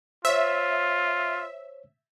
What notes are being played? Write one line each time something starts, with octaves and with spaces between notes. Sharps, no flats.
F4 C5 C#5 E5